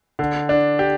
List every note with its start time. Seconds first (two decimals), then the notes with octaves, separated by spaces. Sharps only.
0.19 D3
0.49 D4
0.79 G4